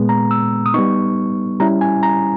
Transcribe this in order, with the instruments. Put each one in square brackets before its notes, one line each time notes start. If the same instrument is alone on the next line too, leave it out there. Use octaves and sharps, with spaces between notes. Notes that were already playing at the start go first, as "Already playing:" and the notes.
Already playing: [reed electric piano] A#2 G#3 B3
A#5
E6
D#6
G3 B3 D#4 C#6
G3 C#4 E4 A#5
G#5
A#5